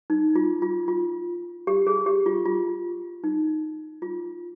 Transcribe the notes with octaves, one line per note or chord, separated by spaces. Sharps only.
D#4
F4
F4
F4
G4
G#4
G4
F4
F4
D#4
F4